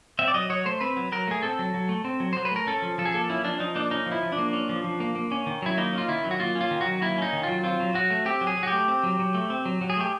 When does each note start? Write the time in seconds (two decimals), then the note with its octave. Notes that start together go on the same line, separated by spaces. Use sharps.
0.19 C4 E5
0.28 D5
0.34 F#3 D#5
0.50 F#3 C#5
0.65 A3 C5
0.81 C4 B4
0.96 F#3
1.12 F#3 A#4
1.28 A3 G#4
1.43 C4 A4
1.59 F#3
1.74 F#3
1.89 A3
2.05 C4
2.20 F#3
2.33 F#3 C5
2.45 B4
2.51 A3 A#4
2.67 C#4 A4
2.82 F3
2.98 F3 A4
3.05 G#4
3.12 A#3 A4
3.29 C#4 E4
3.44 F3 D4
3.60 F3 D#4
3.75 A#3 D4
3.91 C#4 D#4
4.06 F3
4.12 E4
4.23 F3
4.32 D4
4.39 A#3
4.53 C#4
4.69 F3
4.84 F3
5.00 A#3
5.15 A#3
5.31 C#4
5.46 D#3
5.62 F#3 E4
5.78 A#3 D#4
5.93 C#4 F4
6.08 D#3 E4
6.24 F#3
6.31 F#4
6.40 A#3 F4
6.55 C#4
6.61 F4
6.71 D#3
6.81 F#3 F#4
7.02 A#3 E4
7.18 C#4 D#4
7.33 D#3
7.43 F#3 F4
7.63 C4 F4
7.80 F#3
7.94 F#3 F#4
8.10 A3
8.25 C4 G4
8.41 F#3
8.47 G#4
8.58 F#3
8.63 F#4
8.67 G4
8.72 A3
8.88 C4
9.03 F#3
9.19 F#3
9.35 A3
9.50 C4
9.65 F#3
9.81 F#3
9.90 G#4
9.97 A3 G4